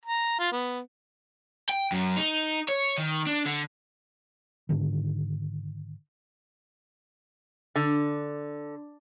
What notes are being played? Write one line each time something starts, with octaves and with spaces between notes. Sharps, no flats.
A#5
F4
B3
G5
F#2
D#4
C#5
D#3
D4
D3
G#2 D3 D#3
D3